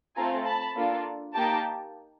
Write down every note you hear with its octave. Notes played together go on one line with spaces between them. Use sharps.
A3 C4 F4 A4 G#5 A#5
A5 B5
A#3 D4 F4 A4
A#3 D#4 G4 G5 A5